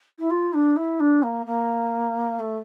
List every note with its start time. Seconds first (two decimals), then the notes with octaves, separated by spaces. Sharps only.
0.19 E4
0.30 F4
0.54 D4
0.77 E4
1.00 D4
1.23 A#3
1.46 A#3
2.40 A3